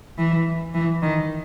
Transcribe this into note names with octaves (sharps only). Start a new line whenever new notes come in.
E3
E3
D#3